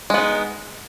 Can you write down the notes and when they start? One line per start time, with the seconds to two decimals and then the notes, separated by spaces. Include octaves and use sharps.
0.10 G#3
0.14 B3
0.18 D#4